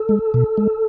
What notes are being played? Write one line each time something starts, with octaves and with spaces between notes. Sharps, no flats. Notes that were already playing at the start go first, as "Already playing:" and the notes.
Already playing: A4
G#3
B2
G#3